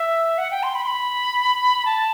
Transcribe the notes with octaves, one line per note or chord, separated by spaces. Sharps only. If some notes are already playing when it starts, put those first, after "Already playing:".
Already playing: E5
F#5
G5
C6
B5
C6
B5
A5